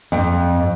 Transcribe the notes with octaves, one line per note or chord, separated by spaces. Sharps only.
F2